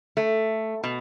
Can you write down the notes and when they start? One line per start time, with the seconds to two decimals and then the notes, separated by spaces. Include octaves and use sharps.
0.17 A3
0.84 B2